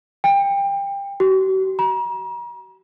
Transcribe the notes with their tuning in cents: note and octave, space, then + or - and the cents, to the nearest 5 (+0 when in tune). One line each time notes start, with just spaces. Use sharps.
G5 +25
F#4 +45
A#5 +40